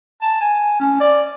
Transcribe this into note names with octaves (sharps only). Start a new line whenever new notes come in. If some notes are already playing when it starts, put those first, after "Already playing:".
A5
G#5
C#4
D5